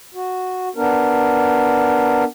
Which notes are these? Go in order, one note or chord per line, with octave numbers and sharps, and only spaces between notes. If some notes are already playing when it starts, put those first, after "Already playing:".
F#4
B3 D4 A#4